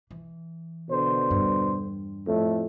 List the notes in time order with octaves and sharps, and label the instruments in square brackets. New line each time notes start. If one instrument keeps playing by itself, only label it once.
[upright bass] E3
[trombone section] B2 D3 C5
[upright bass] E2 G2
[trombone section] F2 A2 A3